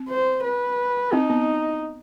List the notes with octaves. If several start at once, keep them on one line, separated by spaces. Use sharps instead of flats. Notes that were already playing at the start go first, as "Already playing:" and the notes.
Already playing: C4
C5
B4
C4 D#4
B3